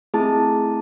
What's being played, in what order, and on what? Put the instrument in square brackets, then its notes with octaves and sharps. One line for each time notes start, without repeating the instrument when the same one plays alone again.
[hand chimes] A3 C4 E4 G#4 A5